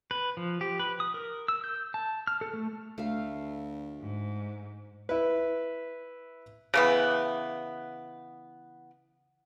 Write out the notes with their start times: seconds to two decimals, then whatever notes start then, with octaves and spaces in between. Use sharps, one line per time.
0.11 B4
0.37 F3
0.61 G4
0.80 B4
1.00 D#6
1.14 A#4
1.48 E6
1.64 G6
1.94 A5
2.27 F6
2.41 A4
2.54 A3
2.98 D2 A3 F5
4.01 G#2
5.09 E4 B4
6.74 C#3 E3 B3